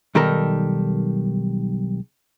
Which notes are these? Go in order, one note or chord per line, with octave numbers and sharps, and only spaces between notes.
B1 D#3 G3 A4 A#4 A#5